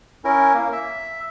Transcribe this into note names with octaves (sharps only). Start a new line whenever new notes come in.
C#4 E4 A#4
A#3
E5